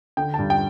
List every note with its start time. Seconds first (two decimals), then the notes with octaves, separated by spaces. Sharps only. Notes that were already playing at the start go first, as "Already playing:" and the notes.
0.17 D3 G5
0.34 G2 A5
0.50 G5